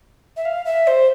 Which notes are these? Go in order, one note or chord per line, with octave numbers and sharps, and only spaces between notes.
E5
F5
E5
C5